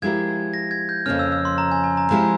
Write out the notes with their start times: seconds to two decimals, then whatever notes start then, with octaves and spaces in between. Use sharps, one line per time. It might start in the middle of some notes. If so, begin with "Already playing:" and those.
0.02 F3 G#3 E4 G4 A#4 G#6
0.54 A#6
0.71 G#6
0.89 G6
1.06 F2 C#3 F3 A#3 C#4 F6
1.19 E6
1.32 E6
1.45 C6
1.58 A#5
1.72 G#5
1.84 G#5
1.97 A#5
2.10 F3 G#3 C4 E4 G4 A#5